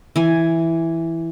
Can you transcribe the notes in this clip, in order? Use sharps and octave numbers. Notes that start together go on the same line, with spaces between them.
E3 G#5